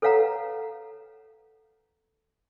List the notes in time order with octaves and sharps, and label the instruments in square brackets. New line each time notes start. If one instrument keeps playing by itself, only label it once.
[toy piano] A4 B4 C#5 F5 F#5 A#5